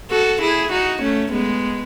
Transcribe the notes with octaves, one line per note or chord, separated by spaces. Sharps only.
F#4 A4
E4 G#4
D#4 F#4
A3 C#4
G#3 B3